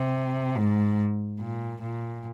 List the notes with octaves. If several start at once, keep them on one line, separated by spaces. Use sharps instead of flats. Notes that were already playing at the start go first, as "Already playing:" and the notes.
Already playing: C3
G#2
A#2
A#2